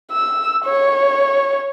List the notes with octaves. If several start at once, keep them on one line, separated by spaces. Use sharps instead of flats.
E6
C#5